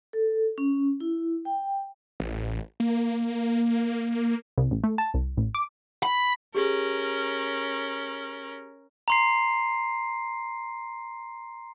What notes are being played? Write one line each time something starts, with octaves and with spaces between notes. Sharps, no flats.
A4
C#4
E4
G5
A1
A#3
C2
A1
A3
A5
C2
A1
D6
B5
C#4 G4 G#4 A#4
A#5 C6 C7